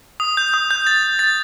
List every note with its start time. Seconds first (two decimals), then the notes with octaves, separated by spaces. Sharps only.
0.20 D#6
0.37 G6
0.54 D#6
0.71 G6
0.87 A6
1.03 A6
1.19 A6